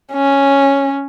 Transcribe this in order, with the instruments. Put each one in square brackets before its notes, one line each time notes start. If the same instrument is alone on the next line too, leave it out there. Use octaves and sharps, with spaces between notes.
[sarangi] C#4